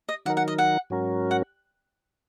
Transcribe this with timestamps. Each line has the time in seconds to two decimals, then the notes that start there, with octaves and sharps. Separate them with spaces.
0.09 D#5
0.26 D#3 F#3 D#4 A#4 F#5
0.37 F#5
0.48 D#5
0.58 F#5
0.90 G#2 F#3 C#4 F#4 A#4
1.31 F#5